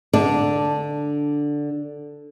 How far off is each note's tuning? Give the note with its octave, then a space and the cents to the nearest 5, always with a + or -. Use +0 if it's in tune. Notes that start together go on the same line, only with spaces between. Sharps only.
D3 +0 D4 -5 D5 +0